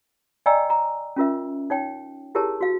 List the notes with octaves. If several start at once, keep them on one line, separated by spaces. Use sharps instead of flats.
D5 D#5 G5 G#5 A#5 E6
A#5
C#4 F4 A#4 E5
D#4 C#5 G5
E4 G4 G#4 A#4 C#5 A5
F#4 F5